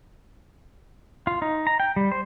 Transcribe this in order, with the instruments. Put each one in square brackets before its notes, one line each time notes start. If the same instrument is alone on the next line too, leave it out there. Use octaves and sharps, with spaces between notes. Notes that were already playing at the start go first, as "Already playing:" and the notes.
[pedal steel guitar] F4
D#4
A#5
G5
G3
C5